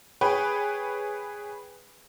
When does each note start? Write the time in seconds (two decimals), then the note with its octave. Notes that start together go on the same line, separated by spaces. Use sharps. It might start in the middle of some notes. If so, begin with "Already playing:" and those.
0.21 G#4 B4 C#5 G5